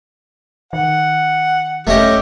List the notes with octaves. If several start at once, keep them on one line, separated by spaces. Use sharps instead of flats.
D#3 F#5
F1 A3 C#4 G4 D#5